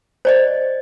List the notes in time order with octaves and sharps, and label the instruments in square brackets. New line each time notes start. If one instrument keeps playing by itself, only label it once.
[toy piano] C5 D5 D#5